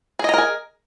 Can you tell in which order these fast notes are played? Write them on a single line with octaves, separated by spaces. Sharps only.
G#4 D#5 A#5 A#4 G#5